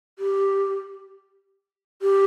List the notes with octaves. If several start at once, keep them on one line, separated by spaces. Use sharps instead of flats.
G4
G4